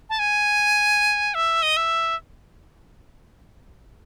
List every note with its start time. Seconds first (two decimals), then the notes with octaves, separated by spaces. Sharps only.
0.09 A5
0.19 G#5
1.34 E5
1.62 D#5
1.77 E5